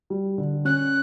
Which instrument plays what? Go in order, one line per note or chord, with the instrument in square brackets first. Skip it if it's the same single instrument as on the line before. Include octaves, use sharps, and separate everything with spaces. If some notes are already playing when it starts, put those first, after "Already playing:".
[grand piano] G3
D3
[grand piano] C#4 [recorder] F#6